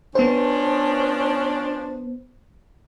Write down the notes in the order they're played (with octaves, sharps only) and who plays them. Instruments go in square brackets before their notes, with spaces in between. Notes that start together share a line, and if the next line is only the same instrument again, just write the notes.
[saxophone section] F3 C#4 D4 [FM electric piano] B3 C5